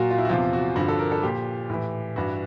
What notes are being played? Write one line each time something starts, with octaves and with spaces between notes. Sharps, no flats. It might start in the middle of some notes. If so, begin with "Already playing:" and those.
Already playing: A#2 F#3 F4 F#4
F4
E4
F#4
E2 C3 F3 F4
F#4
G2 D3 F3 F#4
A4
A#4
A4
A#2 F3 G4
A2 E3
G2 E3 F#4